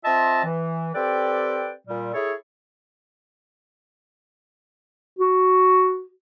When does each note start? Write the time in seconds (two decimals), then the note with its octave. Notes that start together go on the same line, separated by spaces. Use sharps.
0.04 C4 F4 D#5 E5 A5
0.44 E3
0.94 C4 G4 A4 B4 D5 G5
1.87 A#2 G3
2.13 E4 G#4 A4 C#5
5.19 F#4